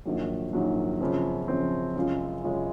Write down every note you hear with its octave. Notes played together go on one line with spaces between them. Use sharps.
A#1 G#2 D#3 F#3
A#1 G#2 D#3 F#3
F#2 C#3 F3 C4
F#2 C#3 F3 C4
F#2 C#3 G#3 C#4 F4
F#2 C#3 G#3 C#4 F4